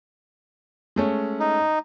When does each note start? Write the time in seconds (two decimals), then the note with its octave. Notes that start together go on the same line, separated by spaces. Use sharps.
0.96 G#3 A3 C#4
1.40 D#4